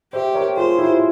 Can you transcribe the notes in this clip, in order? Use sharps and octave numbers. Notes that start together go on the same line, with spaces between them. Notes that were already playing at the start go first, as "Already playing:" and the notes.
G4 C5 E5
A#4 C#5
F4 G#4 C5
E4 G4